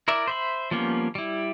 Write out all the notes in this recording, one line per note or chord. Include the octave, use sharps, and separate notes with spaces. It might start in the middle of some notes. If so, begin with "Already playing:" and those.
E4 A#4 D5 E5
C5 E5 B5
F3 G3 A#3 B3 C#4
G3 E4